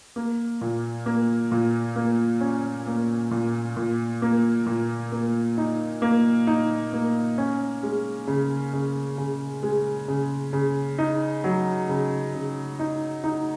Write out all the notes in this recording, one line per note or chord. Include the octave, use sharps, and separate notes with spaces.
A#3
A#2
A#3
A#2
A#3
C#4
A#3
A#2
A#2
A#3
A#2
A#3
D#4
A#3
D#4
A#3
C#4
G#3
C#3
C#3
C#3
G#3
C#3
C#3
D#4
F#3
C#3
C#3
D#4
D#4